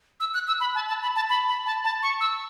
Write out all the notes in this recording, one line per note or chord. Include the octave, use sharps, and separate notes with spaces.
E6
F#6
E6
B5
A5
A5
B5
A5
B5
B5
A5
A5
C#6
E6